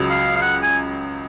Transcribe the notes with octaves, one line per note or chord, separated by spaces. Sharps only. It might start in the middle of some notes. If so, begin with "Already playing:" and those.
Already playing: C#2 C#3 F#3
F5
F5
F#5
G#5